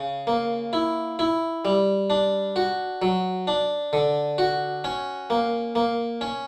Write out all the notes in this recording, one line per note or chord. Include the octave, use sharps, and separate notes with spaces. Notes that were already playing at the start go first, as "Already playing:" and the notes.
Already playing: C#3
A#3
E4
E4
G3
D4
F#4
F#3
D4
D3
F#4
C#4
A#3
A#3
C#4